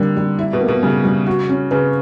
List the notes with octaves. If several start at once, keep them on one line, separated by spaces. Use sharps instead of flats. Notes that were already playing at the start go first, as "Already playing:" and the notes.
Already playing: D3 G3 A#3
G3
E4
B2
A#3
B2
C#3 G3
G3
F#4
C#4
C#3 B4